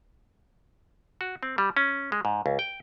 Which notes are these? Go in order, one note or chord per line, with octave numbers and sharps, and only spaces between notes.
F#4
C4
G3
C#4
G#3
G#2
C#2
G5